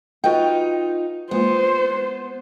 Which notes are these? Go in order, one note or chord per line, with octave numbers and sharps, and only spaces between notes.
D#4 F4 F#4 B4 G5
G#3 A#3 B3 F4 C5